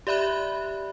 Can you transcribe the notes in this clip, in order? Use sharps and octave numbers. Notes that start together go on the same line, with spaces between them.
G4 D5 E5 B5 F#6